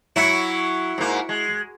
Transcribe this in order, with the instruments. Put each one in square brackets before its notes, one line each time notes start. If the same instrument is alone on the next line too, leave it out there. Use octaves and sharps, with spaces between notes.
[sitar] F#3 [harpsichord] E4 F#5
[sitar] G#2 A#3
G#3